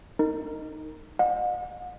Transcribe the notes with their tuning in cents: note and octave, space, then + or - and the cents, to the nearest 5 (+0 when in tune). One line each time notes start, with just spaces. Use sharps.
D#4 +0 A#4 -30
D#5 -25 F#5 -45